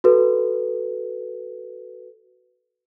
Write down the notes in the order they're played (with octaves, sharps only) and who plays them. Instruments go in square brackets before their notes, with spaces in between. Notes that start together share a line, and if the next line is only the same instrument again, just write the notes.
[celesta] F#4 A4 B4